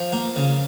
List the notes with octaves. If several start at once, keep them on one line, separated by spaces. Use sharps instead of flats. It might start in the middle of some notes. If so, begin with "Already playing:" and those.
Already playing: F3
A#3
C#3